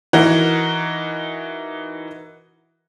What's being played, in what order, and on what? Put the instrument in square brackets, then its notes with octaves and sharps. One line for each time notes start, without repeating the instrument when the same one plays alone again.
[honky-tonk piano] E3 D#4 F#4 A#4